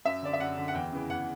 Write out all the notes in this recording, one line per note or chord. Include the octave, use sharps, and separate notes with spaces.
F#2 E5
D3 D5
E5
F#2 F#5
D3
F#5
E2 G5
C#3 E3
E2 F#5